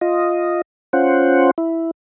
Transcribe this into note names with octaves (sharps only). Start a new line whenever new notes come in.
F4 D#5
C#4 F4 C5 F#5
E4